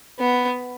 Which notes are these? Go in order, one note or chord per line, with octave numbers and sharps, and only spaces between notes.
B3